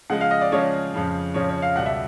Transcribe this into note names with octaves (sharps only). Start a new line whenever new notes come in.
C#3 F3 G#3 F#5
F5
D#5
D5
C#3 F3 G#3 C#5
F2 C#3 F3
F2 C#3 F3 C#5
C#5
F5
C#2 B2 G3 F#5
E5